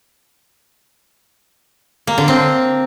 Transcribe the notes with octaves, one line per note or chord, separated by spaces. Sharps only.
A#3
D3
C4